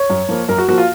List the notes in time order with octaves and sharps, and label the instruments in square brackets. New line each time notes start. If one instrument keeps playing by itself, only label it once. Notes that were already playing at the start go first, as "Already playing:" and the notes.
Already playing: [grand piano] C#5
F#2
F3 A#3
F#2 A#4
F#4
F3 A#3 F#4
F4